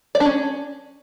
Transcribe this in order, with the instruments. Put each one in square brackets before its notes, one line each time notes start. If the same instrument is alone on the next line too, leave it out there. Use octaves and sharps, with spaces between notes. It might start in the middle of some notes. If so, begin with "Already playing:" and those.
[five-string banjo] D5
D4
C#4